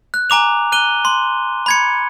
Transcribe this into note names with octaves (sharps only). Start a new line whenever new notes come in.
F#6
G#5 A#5 D6 F7
F#6 D#7 G7
C6
B5 G#6 C#7